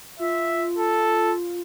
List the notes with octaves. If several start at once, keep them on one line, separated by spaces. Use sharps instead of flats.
F4 E5
A4